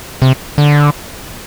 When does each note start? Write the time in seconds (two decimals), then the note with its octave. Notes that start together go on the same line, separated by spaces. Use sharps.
0.22 C3
0.58 D3